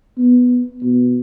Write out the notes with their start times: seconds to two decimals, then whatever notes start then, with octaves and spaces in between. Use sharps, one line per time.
0.18 B3
0.83 B2